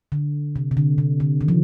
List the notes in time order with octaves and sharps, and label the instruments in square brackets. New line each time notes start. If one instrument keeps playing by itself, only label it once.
[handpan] D3
C3
C3
D3
C3
D3
D#3
F3